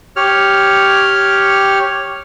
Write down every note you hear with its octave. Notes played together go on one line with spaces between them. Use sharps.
G4 C#5 F6